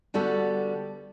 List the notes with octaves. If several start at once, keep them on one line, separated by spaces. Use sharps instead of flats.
D3 G3 B3 F#4 A4